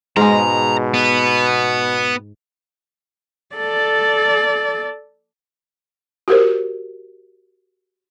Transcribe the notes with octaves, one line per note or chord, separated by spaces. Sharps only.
G#2 B2 G#3 A#5
B3
A4 D5
F#4 G4 A#4 C5